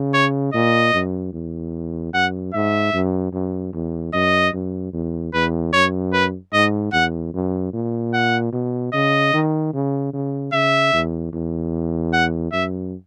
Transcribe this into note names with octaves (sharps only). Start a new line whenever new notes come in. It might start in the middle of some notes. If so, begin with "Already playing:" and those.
Already playing: C#3
C#5
A#2 D#5
F#2
E2
F#2 F#5
G#2 E5
F#2
F#2
E2
F#2 D#5
F#2
E2
E2 B4
F#2 C#5
B4
G#2 D#5
E2 F#5
F#2
A#2
F#5
B2
C#3 D#5
D#3
C#3
C#3
C#3 E5
E2
E2
F#5
F#2 E5